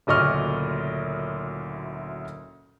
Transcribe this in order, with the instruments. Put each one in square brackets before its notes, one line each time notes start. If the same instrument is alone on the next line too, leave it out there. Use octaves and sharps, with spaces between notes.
[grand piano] F#1 D2 A#2 D#5 C#6 F6